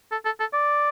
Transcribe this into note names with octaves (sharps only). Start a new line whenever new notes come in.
A4
A4
A4
D5